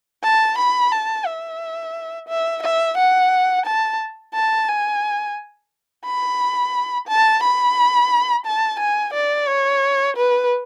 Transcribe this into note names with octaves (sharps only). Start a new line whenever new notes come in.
A5
B5
A5
E5
E5
E5
F#5
A5
A5
G#5
B5
A5
B5
A5
G#5
D5
C#5
B4